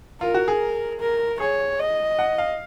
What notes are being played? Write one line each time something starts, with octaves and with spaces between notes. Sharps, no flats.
F4 A#4
F#4
G#4
A#4
G#4 C#5
D#5
F#5
F5